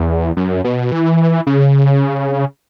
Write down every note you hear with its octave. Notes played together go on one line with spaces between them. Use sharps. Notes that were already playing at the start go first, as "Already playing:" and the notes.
Already playing: E2
F#2
B2
E3
C#3